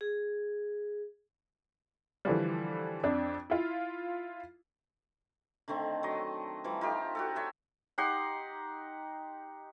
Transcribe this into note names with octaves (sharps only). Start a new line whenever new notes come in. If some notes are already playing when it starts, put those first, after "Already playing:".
G#4
D3 E3 F3 G3
F2 D4
E4 F4
D3 D#3 A3 C4
F#3 D#5
E3 F3 G3
D#4 F4 G4 A4
F#4 G4 A4
C#5 E5 C6
D#4 G4 F#5 C6